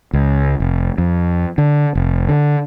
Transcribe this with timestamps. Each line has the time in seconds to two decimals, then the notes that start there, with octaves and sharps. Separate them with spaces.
0.13 C#2
0.60 F1
0.98 F2
1.58 D3
1.95 F1
2.29 D3